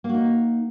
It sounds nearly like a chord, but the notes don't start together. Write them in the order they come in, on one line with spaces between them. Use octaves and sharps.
A#3 F#4 D#4